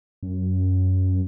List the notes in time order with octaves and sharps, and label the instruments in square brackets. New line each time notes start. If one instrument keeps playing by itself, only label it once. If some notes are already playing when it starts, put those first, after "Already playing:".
[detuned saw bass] F#2